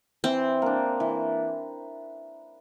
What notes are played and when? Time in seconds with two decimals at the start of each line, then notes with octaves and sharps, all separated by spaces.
0.24 E3 C4
0.62 A#3 D4
1.00 E3